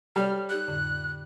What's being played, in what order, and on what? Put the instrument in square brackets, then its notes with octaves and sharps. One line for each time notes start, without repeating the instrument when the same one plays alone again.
[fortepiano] G3 [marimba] A4 C#5 [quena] F6
[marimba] D#4 G4 D5 [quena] F#6
[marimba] F2 A2 D3